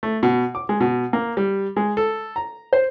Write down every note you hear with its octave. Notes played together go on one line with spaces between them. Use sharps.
A3
B2
D6
G#3
B2
A#3
G3
G#3
A4
A#5
C5